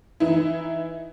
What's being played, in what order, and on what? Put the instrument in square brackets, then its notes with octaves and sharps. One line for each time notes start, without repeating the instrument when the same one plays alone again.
[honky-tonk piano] E3 D#4 E4